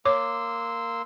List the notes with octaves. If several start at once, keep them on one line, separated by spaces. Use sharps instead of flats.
A#3 C#5 C6 D6 E6